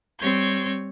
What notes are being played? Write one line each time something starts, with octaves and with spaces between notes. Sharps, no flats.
G3 C4 C#5 G6 G#6